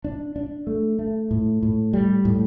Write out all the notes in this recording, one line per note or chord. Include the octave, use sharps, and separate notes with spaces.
D4
D4
A3
A3
A2
A2
G3
A2